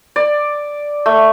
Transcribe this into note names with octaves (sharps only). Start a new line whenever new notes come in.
D5
A3